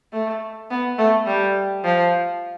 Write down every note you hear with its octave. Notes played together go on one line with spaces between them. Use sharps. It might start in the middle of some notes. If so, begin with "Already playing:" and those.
A3
B3
A3
G3
F3